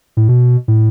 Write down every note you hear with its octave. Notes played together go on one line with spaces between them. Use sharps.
A2
B2
A2